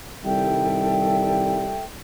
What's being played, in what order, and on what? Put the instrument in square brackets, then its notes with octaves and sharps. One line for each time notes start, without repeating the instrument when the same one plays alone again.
[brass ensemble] C2 D#3 G3 [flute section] A4 E5 G5